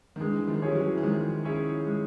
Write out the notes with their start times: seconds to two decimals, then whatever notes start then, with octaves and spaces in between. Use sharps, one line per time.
0.16 D#3
0.20 D3 E3 G#3
0.38 E3
0.48 D#3 F3
0.62 G3 C#4 E4 G#4 C#5
0.75 E3 F#3
0.98 E3
1.03 D#3 F3 G#3
1.45 C#4 E4 G#4 C#5
1.86 G#3